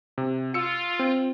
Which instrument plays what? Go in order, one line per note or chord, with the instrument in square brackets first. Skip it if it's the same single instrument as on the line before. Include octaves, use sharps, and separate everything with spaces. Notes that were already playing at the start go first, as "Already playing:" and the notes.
[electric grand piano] C3
[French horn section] F4 [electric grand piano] E6 C#7
[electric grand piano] C4